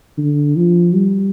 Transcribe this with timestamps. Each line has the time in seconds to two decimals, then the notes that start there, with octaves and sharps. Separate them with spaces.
0.18 D3
0.56 F3
0.95 G3